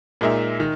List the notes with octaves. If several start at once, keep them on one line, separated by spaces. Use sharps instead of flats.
A#2 G#3 D#4 A#4 E5
D#3